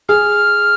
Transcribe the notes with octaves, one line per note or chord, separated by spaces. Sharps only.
G#4 F6